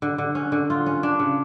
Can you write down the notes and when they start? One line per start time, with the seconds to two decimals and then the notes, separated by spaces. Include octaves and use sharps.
0.02 D3
0.18 D3
0.35 C#4
0.52 D3
0.70 F4
0.86 C#4
1.03 D4
1.19 C#3